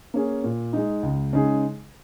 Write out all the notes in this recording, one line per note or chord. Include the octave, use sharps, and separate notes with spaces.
A#3 C#4 G#4
A#2
G#3 D#4
C#2
C#3 G#3 D#4 G#4